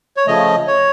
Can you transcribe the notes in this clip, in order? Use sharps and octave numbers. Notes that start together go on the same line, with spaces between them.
C#5
C#3 F3 A3 D#5
C#5